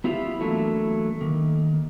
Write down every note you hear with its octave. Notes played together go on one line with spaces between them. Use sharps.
B3 E4 F4 G4 E5
E3 F#3 A3 A#3 D4
D#3 A#3